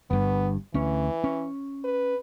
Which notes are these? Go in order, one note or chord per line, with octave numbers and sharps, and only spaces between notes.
G1 G2 B3
D2 E3 C#4
C#4
B4